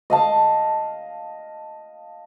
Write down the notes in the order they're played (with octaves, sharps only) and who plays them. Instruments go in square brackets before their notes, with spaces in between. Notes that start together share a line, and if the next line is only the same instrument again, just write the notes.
[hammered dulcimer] D#5 F5 A5